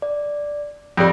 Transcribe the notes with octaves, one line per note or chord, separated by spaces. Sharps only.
D5
F2 G3 A#6 D7